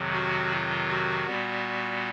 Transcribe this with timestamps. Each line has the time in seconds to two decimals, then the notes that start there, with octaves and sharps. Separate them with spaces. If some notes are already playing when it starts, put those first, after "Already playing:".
Already playing: F2 C3 D#3 F#3
0.13 F#4
0.51 F4
0.89 F#4
1.26 A#2 G3 B3